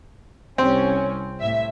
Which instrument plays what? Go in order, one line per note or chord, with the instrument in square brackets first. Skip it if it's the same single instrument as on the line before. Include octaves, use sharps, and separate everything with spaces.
[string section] C2 C#4 [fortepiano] C4
[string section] A2 E5